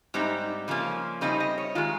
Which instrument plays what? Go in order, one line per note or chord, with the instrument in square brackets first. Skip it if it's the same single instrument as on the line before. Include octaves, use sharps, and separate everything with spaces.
[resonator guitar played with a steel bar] G#2 G3 C4 D#4
C#3 F3 A#3 C#4
C#3 G3 C4 D#4 D#5
D#5
C#5
D#3 G#3 F4